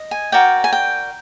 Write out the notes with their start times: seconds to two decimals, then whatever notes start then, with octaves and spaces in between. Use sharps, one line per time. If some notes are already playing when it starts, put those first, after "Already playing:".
Already playing: D#5
0.11 G#5
0.32 F#4 A#4 D5 G5
0.64 G#5
0.73 G5